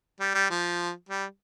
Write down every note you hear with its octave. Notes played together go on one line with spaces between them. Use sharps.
G3
G3
F3
G3